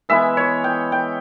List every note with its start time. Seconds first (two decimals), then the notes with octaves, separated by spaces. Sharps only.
0.09 E3 G#3 B3 E4 E5
0.37 C#5
0.64 G5
0.92 G5